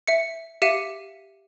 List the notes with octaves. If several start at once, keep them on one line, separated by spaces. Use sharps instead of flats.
E5 C#7
G4 E5 F5 C#7 D#7